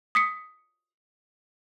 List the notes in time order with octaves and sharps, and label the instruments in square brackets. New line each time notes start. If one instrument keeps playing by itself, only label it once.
[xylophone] D#6 B6 C#7